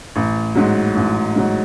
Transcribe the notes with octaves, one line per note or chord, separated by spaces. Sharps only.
A1
G#2 F#3
A1
G#2 F#3